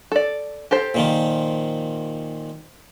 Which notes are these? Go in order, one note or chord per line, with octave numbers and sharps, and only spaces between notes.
A4 D5
G4 A4 C5
A#2 D#3 F3